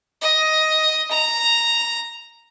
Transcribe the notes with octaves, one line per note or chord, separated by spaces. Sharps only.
D#5
A#5